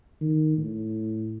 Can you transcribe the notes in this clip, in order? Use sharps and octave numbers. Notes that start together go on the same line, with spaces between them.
D#3
A2